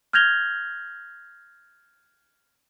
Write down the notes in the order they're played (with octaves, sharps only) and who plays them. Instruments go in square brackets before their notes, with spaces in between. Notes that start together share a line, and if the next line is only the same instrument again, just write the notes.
[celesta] F6 G6 G#6 A#6 F7 G7